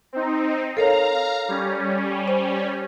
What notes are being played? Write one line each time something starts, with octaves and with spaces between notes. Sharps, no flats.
C4 D#4
A4 A#4 C#5 F5 A#5
G3 C#4
C5